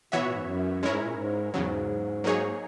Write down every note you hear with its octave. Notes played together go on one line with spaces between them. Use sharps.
B2 E3 B3 F#4 C#5 E5
A#2
G#2
F#2
G#2 G#3 C#4 E4 A#4 C#5
A#2
G#2
E2 G#2 C#3 F#3
F#3 A#3 D#4 G#4 C#5